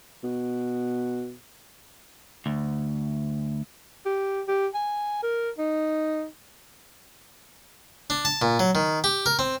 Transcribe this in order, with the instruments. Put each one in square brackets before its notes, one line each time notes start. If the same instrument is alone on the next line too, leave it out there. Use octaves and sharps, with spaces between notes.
[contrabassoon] B2
[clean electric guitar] D2
[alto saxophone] G4
G4
G#5
A#4
D#4
[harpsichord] D4
A5
A#2
F#3
D#3
G4
A#4
C4